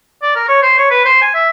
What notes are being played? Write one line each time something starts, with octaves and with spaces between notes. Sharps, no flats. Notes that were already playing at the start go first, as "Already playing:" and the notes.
D5
A#4
C#5
C5
C#5
B4
C5
G#5
E5